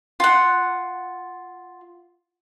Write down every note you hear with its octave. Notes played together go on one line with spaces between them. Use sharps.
F4 F#5